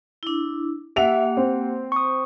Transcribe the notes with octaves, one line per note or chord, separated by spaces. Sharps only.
D4 E4
A#3 G4 E5 F#5 F7
C4
C#6 D#6